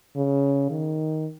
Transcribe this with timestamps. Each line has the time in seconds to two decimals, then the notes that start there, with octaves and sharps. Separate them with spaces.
0.16 C#3
0.70 D#3